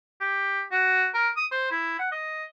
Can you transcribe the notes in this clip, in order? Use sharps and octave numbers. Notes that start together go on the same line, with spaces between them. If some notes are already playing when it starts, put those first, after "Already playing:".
G4
F#4
A#4
D#6
C5
E4
F#5
D#5